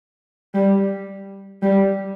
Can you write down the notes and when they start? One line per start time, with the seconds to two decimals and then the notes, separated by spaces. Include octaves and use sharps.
0.54 G3
1.63 G3